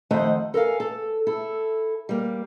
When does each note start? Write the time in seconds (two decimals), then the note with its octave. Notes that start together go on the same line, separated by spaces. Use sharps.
0.11 F2 D#3 A3 D#4 C5 F#5
0.54 A4 A#4 C#5 F5 G#5
0.80 A4
1.27 E4 A4
2.09 G3 A#3